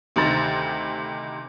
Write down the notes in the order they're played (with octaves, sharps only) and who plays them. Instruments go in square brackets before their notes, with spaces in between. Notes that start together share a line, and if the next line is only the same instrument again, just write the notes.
[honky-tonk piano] D2 C3 D#3 C5 A#5 A6